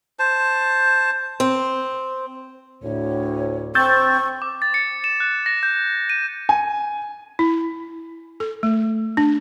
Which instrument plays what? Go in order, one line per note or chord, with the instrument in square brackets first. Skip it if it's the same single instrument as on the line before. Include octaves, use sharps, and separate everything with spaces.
[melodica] C5 A5
[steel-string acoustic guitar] C4
[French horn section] D2 A2 [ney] C#5
[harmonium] C4 [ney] C#6 [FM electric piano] E6 G6 A6
[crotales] D6
A6
C#7
E7
F#6
A#6
G6
D#7
[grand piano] G#5
[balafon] E4
A4
A3
D4